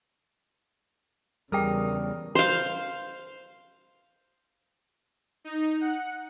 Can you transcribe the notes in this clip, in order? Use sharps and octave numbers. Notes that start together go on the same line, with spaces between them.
E2 C#3 G3 G#4 A#4 G5 D#6
C5 F5
D#4
F#5